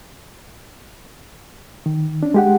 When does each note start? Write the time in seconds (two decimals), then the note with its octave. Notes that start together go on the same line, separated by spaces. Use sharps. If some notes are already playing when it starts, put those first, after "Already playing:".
1.86 D#3
2.23 C#4 D4
2.34 G#3 G4 F#5